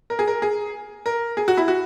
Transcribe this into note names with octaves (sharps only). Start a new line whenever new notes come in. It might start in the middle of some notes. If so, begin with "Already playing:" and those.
A#4
G#4
A#4
G#4
A#4
G#4
F#4
E4
F#4